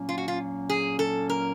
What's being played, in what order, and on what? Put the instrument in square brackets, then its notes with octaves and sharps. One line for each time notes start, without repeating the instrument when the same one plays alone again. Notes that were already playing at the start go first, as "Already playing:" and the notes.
Already playing: [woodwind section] A#2 F#3 A#3 C#4
[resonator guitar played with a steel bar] F4
F#4
F4
G#4
A4
A#4